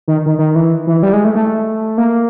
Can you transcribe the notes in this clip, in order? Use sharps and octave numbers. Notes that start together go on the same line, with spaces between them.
D#3
D#3
D#3
E3
E3
G3
G#3
A3
A3
A#3